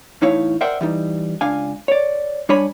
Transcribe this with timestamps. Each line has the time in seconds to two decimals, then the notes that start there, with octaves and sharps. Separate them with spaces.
0.22 E2 A2 D#4 E4 C#5 F5
0.61 A#4 C5 D5 E5 F#5 G5
0.81 E3 G3 D#4
1.41 C#2 D4 F5 G#5
1.88 C#5 D5
2.49 G3 D4 C#5 G#5 B5